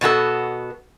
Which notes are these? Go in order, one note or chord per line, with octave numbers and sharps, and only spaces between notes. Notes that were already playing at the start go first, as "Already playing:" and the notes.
B2 B3 F#4 A4